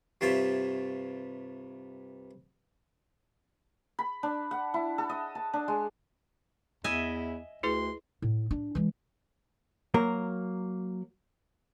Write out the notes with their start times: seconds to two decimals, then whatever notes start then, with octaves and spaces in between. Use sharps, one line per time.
0.21 G2 C3 F4 C#5 E5
3.99 B5
4.23 D4
4.51 F#5
4.74 E4
4.98 A4
5.09 D#5
5.35 A5
5.53 D4
5.68 G#3
6.84 E2 E4 D#5 E5 G#5
7.63 D2 E4 G#4 B4 C6
8.22 A2
8.51 D4
8.75 E3 G#3
9.94 F#3 A#3 A#4